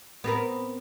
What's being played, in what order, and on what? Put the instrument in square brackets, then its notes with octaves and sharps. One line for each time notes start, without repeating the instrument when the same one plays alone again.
[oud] B3 C4 A#4